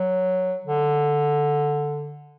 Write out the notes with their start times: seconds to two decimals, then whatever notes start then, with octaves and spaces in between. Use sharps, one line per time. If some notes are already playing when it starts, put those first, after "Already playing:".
Already playing: F#3
0.65 D3